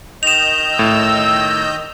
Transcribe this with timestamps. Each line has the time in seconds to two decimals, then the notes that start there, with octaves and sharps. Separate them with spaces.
0.23 D#3 D#5 G6 E7 F7
0.79 A2 E6